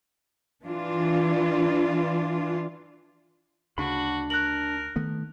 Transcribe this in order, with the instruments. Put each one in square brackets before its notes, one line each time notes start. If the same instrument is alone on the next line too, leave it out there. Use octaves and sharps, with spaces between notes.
[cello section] E3 D4 F4
[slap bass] D2 C#3 [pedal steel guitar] D4 B5 [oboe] F#4
[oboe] A#4 [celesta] F#6 F#7
[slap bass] D#3 A3 B3